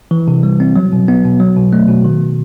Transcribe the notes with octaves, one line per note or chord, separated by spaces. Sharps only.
E3
C3
G3
C4
F#3
B2
B3
B2
F#3
B2
A3
B2
D#3